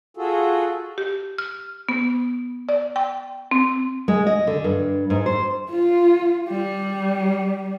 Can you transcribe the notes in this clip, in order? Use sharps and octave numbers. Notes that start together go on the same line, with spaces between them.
F4 F#4 G#4 A4
G4
F6
B3
D5
G5
C4
G#3
D#5
D3
G2
G#2
C5
F4
G3